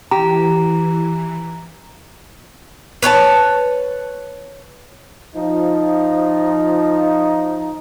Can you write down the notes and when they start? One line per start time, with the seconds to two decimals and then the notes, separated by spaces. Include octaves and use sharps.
0.11 E3 G4 A#5
3.03 B4 C#5 G#5 A5
5.36 F3 D#4